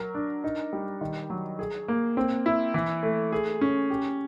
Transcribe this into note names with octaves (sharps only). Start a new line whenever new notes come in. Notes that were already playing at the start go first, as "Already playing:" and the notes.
Already playing: F#3 A#4
D4
D#4
G3
D#3
F#3
G#4
A#3
C4
E4
E3
A3
G#4
C#4
G4